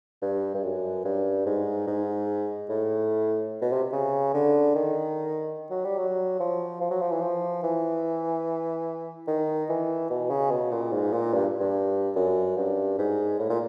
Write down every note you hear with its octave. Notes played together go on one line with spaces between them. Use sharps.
G2
G2
F#2
G2
G#2
G#2
A2
B2
C3
C#3
D3
D#3
F#3
G3
F#3
F3
F3
F#3
F3
E3
F3
E3
D#3
E3
B2
C#3
B2
A#2
G#2
A#2
G2
G2
F#2
G2
G#2
A2
A#2